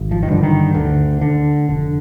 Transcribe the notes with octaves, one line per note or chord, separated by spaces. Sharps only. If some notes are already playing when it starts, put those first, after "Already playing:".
Already playing: G#1
F3
D#3
G2 D3 F3
D#3
D2 D3
D3
F1 D3